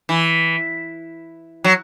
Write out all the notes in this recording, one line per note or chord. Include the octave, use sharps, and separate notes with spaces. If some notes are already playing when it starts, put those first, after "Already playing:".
E3
F#3